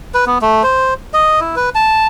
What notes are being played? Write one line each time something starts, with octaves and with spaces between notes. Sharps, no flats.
B4
B3
A3
C5
D#5
E4
B4
A5